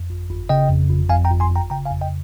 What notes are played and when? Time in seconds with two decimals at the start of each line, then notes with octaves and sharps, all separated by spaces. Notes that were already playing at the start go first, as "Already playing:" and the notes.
Already playing: F2
0.10 G1
0.30 G1
0.49 C#3 D#5 G5
0.69 F2
0.89 G1
1.09 F2 F5 G#5
1.25 G5 A#5
1.30 G1
1.40 G#5 C6
1.51 G1 G5 A#5
1.70 C#3 G5 A#5
1.85 F5 G#5
1.91 F2
2.01 D#5 G5